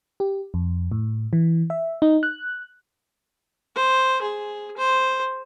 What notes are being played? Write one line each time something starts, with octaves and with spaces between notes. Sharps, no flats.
G4
F2
A2
E3
E5
D#4
F#6
C5
G#4
C5